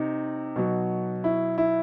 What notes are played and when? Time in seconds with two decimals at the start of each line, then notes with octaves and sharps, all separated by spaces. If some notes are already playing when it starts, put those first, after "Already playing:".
Already playing: C3 D#4
0.56 B2 F#3
1.24 E4
1.58 E4